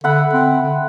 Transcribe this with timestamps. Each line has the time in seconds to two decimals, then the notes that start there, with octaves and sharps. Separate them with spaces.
0.04 D3 E5 F#5 B5
0.33 C4
0.62 D3